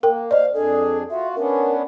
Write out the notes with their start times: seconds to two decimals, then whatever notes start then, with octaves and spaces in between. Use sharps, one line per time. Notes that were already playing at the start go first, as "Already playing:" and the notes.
0.03 A#3 A#4 G5
0.31 C5 D5 D#5 F5
0.54 F2 D4 G#4 A4
1.10 F4 F#4 E5
1.36 B3 C#4 D4 A#4